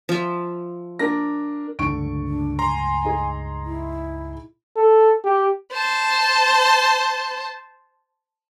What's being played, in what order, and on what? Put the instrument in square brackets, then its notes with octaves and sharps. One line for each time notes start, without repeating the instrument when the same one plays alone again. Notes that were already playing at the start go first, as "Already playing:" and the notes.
[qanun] F3 E5
[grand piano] D4 A#4 A#6
[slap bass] C#2 G2 A3 [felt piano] D3 C#6 D7
[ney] D4
[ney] G#5 [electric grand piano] A#5 C6
[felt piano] D#4 G#4
[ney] E4
[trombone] A4
G4
[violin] C5 A5